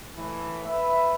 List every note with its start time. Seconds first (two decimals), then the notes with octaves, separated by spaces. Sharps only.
0.17 A2 E3
0.65 B4 E5